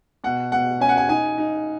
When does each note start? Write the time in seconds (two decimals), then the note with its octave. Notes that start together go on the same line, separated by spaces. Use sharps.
0.24 B2 F#5
0.52 B2 F#5
0.80 C#4 G#5
0.89 F#5
0.97 G#5
1.09 D#4 G#5
1.38 D#4